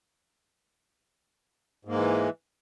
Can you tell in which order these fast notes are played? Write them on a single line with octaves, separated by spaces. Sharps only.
G#2 A#3 G#3 E3